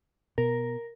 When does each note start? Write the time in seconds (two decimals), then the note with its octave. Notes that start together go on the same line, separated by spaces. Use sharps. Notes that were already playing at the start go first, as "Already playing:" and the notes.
0.38 B2 A#4